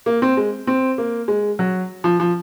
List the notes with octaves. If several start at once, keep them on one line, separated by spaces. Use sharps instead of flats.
A#3
C4
G#3
C4
A#3
G#3
F#3
F3
F3